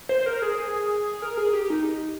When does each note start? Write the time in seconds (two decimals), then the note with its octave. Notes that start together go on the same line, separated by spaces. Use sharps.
0.09 C5
0.26 A#4
0.42 G#4
0.58 G#4
1.22 A#4
1.37 G#4
1.53 G4
1.70 D#4